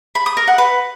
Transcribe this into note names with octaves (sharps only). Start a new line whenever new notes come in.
B5
D#6
A#4
F#5
B4